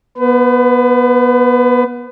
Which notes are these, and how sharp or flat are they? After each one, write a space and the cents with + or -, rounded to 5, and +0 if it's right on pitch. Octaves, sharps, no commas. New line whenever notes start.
B3 -25 B4 +30